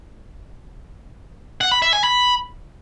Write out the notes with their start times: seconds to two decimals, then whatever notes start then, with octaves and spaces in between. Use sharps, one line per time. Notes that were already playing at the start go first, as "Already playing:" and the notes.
1.61 F#5
1.72 B5
1.82 E5
1.93 G#5
2.04 B5